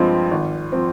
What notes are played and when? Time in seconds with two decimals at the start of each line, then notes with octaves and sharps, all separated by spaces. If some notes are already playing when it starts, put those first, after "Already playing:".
Already playing: G2 F3 G#3 C4 F4
0.31 G#1
0.72 F3 C4